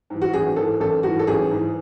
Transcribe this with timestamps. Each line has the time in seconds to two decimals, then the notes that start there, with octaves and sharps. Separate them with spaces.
0.10 G#2 E3
0.22 F#4
0.33 A1 G#4
0.56 G#2 E3 A4
0.80 A1 A4
1.03 G#2 E3 F#4
1.19 A4
1.27 A1 G#4
1.51 G#2 E3